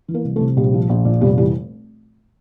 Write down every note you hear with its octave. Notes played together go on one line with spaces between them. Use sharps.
E3
A#3 A#4
C2
A3 A4
C3
A#1 G3 G4
F3
A#1
A#2
F1 G3 G4
E3 G3 G4